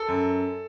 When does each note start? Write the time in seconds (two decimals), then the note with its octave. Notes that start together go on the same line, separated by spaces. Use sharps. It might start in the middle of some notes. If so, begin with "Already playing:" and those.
Already playing: A4
0.08 F#2